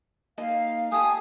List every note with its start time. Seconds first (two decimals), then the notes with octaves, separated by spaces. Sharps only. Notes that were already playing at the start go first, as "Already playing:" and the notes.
0.38 A#3 D#4 D#5 F5
0.92 A3 G4 A4 G#5 D#6